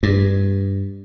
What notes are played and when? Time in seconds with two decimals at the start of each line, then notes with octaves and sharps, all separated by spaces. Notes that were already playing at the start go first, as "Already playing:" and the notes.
0.03 G2